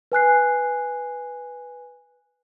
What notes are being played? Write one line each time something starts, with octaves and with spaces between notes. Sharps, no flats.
B4 G#5 F#6 C7